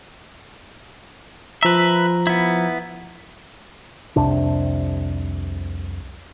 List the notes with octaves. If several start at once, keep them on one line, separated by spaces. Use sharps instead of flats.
F3 B4 E5 A#5
B3 E4
C2 F2 C3 D4